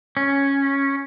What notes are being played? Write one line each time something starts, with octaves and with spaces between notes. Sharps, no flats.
C#4